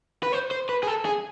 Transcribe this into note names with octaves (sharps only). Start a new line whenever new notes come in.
B4
C5
C5
B4
G#4
A4
G#4